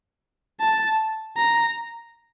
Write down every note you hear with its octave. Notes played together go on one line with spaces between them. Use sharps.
A5
A#5